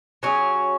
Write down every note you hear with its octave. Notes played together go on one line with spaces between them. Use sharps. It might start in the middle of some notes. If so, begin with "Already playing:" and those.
F#3 C#4 G#4